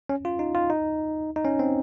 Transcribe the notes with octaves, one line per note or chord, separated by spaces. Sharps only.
C#4
F4
D#4
F4
D#4
D#4
C#4
C4